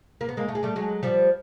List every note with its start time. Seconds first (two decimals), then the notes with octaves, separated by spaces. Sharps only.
0.21 A#3
0.29 B3
0.37 G#3 A#3
0.48 A3
0.55 G#3
0.63 G3 A3
0.76 F#3 G#3
1.03 F3 G3